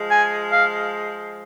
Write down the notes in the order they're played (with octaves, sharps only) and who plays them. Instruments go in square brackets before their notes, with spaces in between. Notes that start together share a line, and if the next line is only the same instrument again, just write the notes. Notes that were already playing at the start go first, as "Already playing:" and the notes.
Already playing: [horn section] F3 G#3
[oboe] G#5
F5